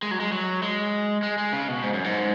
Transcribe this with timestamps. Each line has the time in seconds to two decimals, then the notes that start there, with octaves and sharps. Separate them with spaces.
0.03 G#3
0.11 F#3
0.20 G#3
0.32 F#3
0.63 G#3
1.23 G#3
1.38 G#3
1.53 C#3
1.68 B2
1.83 G#2
1.93 F#2
2.04 G#2